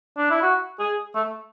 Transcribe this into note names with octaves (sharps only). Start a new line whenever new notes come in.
D4
E4
F#4
G#4
A3